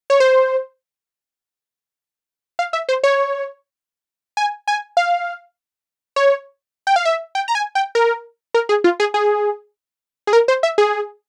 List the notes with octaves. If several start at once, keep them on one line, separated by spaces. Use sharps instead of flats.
C#5
C5
F5
E5
C5
C#5
G#5
G#5
F5
C#5
G5
F5
E5
G5
A#5
G#5
G5
A#4
A#4
G#4
F4
G#4
G#4
G#4
A#4
C5
E5
G#4